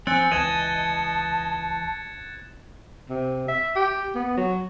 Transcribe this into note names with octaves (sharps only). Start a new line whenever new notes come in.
F3 C4 G#5 F#6 A6 C#7
C#2 E3 D#5 A5 F#6 G#6 E7
C3
E5
G4
B3
F#3